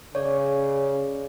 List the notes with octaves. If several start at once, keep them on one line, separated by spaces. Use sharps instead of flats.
C#3 C#5 D5